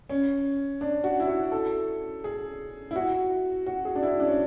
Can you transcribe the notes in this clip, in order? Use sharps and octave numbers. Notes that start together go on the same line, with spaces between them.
C#4
D4
F#4
E4
F#4
A4
G#4
E4
F#4
F#4
G#4
D4
E4
D4
C#4